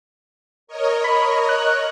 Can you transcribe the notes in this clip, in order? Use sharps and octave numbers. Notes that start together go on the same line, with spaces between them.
A#4 C#5 D#5
B5
F#6